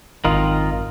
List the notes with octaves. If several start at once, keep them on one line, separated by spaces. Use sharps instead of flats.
G#1 F#2 D#3 D#4 F4